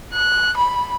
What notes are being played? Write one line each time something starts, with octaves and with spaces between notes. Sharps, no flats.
F#6
B5